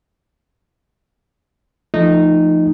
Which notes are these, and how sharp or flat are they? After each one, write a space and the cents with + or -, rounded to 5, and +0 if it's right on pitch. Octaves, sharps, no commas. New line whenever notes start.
F3 -25 A3 +0 D#4 -10